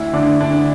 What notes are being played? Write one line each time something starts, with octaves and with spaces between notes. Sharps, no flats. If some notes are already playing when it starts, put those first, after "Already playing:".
Already playing: D2 E4
D3 D4
D2 D4